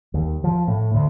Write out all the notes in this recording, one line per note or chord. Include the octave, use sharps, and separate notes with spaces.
D#2
F3
A2
D2